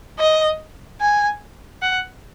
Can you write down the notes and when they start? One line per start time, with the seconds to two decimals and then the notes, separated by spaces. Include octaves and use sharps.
0.19 D#5
1.01 G#5
1.82 F#5